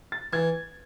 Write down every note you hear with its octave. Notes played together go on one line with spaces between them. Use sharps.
A6
E3 G#6